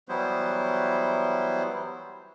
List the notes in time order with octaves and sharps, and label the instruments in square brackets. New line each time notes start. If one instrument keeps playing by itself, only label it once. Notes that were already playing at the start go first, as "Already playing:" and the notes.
[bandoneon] E3 F#3 G3 B3 E4 C5